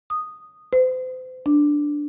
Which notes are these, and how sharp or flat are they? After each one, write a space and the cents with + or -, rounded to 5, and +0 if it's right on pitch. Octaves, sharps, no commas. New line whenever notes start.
D#6 -5
C5 -40
D4 +0